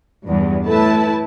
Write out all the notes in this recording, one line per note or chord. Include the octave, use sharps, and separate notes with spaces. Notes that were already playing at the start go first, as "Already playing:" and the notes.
E2 G2
A2 A3 E4 B4 A5